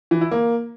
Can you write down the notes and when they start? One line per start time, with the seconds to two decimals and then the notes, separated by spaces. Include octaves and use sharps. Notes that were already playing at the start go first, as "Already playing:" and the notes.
0.11 E3
0.21 E4
0.31 A#3